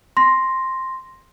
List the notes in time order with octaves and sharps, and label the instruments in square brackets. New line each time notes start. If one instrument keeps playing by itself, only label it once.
[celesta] C6 A#6